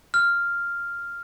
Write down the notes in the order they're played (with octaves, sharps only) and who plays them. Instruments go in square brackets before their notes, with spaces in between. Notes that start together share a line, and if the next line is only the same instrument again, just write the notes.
[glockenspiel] F6